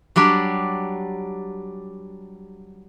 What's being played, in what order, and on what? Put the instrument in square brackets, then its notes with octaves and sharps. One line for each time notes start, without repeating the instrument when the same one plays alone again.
[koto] F#3 G3 D4 G4